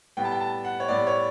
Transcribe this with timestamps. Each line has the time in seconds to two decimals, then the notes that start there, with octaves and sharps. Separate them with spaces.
0.17 A2 G3 B3 G5
0.25 A5
0.32 G5
0.40 A5
0.64 F#5
0.80 C#5
0.88 A2 G3 B3 D5
1.07 C#5